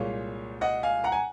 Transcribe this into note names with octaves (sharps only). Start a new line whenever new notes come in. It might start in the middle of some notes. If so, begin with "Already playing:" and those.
Already playing: C2 A#2 G#3 C#5 F5
D#5 F#5
F5 G#5
F#5 A#5
G#5